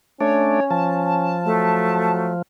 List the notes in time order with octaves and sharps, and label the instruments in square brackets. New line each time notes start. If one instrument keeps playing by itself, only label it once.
[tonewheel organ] A3 D4 [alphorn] C#4 [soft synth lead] C#5
[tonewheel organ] F3 [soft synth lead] A5
[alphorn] F#3 [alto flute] A3